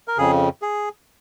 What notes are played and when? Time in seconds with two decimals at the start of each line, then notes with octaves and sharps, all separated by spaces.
0.08 A#4
0.18 F2 C#3 G#4
0.62 G#4